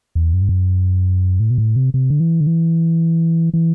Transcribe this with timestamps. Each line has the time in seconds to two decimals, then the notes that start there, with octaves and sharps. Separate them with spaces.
0.15 E2
0.33 F#2
0.42 G2
0.49 F#2
1.40 A2
1.50 B2
1.58 A2
1.76 C3
1.94 C3
2.10 D3
2.20 E3
2.41 D3
2.47 E3
3.54 E3